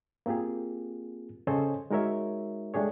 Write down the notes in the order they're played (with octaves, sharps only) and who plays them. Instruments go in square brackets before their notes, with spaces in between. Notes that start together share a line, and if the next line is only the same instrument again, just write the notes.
[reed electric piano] A#3 C4 F4 G4 G#4
C#3 A4 C5 C#5 D#5 G#5
G#3 D#4 F#4 A#4 C#5 E5
G#3 A3 D4 G4 G#4 C#5